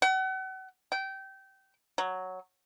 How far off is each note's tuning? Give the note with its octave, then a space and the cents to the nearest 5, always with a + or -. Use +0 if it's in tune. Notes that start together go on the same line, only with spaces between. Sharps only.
F#5 +40
G5 -20
F#3 +0